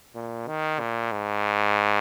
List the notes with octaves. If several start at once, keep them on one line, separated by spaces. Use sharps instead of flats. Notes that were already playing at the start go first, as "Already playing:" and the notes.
A#2
D#3
A#2
G#2